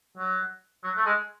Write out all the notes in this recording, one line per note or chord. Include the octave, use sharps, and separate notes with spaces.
F#3
F#3
A3
G#3